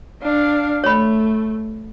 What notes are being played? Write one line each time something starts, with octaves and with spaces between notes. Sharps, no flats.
D4 F5
A3 C#5 B5